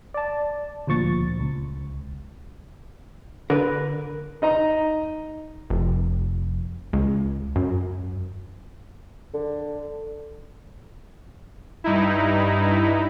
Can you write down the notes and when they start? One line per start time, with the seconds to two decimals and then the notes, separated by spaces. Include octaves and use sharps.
0.14 D5 A5
0.87 D2 A#2 F3 C#6 A6
1.40 C#2
3.50 D3 A#4 B4
4.42 D#4 D#5 A#5
5.70 F1
6.93 C#2
7.56 F#2
9.34 D3
11.84 G2 D#4 E4